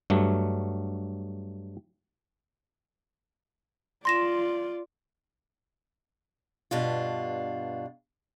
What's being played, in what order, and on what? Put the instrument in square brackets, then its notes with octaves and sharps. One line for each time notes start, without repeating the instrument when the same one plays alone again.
[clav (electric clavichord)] G2 F#3 A3
[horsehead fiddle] F4 D5 [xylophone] C6 A#6 E7
[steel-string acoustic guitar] G2 B2 D4 F4